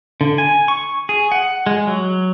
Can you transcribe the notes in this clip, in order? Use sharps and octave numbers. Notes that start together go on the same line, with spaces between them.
D3
G#5
C#6
G#4
F#5
G#3
F#3